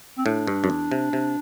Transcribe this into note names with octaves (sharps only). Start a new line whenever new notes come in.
C4
A2 D4
G2
F#2
E2
C3
C3